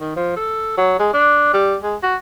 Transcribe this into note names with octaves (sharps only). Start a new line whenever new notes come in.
D#3
F3
A4
F#3
G#3
D4
G3
G#3
F#4